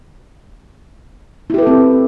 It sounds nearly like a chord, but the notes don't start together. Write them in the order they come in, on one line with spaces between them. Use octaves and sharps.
E4 G4 B4 A4 C4